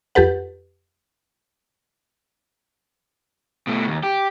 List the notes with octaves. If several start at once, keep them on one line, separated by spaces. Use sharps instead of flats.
F2 G4 A4 B4 F#5
B2 A3
D#2
G4